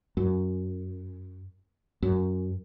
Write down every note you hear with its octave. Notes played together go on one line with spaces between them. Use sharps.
F#2
F#2